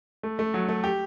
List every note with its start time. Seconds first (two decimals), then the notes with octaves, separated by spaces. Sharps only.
0.23 A3
0.39 A3
0.54 F#3
0.68 A3
0.84 G4